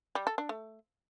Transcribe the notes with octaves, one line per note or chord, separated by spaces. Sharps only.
G3
A4
D4
A3